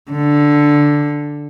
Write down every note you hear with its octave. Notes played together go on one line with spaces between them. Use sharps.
D3